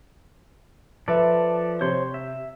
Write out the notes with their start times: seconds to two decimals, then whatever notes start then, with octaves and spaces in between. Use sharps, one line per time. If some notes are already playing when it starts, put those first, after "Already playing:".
1.08 F3 A4 B4 D5 E5
1.81 C3 C5 C#5 C6
2.14 E5